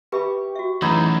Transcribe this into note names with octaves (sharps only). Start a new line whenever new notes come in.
G4 B4 E5 B5 C#6
F#4 E5
F#2 A2 E3 D#4 E4 G#4 B5